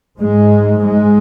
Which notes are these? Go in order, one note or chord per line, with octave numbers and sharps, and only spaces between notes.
G#2 G#3
G#3